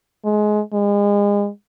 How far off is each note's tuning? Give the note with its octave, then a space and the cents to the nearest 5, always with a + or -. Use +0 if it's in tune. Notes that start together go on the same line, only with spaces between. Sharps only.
G#3 +20
G#3 -35